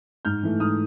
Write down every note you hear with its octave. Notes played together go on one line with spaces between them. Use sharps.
G#2 F6 G6
E3 A3
G#2 D#6 F6